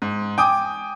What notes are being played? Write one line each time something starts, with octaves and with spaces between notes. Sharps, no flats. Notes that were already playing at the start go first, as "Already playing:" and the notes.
G#2
G5 G#5 D6 D#6